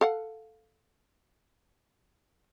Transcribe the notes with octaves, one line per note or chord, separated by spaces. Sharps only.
A4 F5 F#5